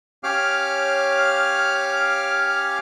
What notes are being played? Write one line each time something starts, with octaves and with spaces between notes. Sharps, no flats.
C#4 G4 C#5 F5 D6 F6